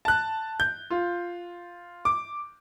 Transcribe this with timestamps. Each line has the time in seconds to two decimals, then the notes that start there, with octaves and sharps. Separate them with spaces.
0.05 A5 F#6
0.60 G6
0.90 F4
2.05 D6